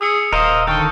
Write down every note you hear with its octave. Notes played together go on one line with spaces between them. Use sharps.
G#4 D#6 E6 C#7
D#1 A#4 C5 D#5 F5 D#7
D3 D#3 A4 G5 C#6 F6 G6